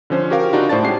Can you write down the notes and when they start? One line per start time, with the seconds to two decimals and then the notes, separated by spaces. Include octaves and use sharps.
0.10 D3 F3 C#4 C5
0.30 F#4 G4 A#4 F5
0.53 C#3 D4 D#4 F4 F#4
0.69 A2 C5 D5 A5 A6
0.83 G#3 C#4 G4 C7